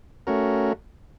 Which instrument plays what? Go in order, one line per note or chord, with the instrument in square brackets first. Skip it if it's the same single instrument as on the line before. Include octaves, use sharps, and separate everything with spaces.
[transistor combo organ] A3 C#4 F#4 A#4